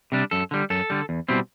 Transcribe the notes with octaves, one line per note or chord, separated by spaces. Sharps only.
C3 G3 D4
F#2 A4
D3 G3
F#2 A4
D3 G3
E2
B2 G3 C4 E4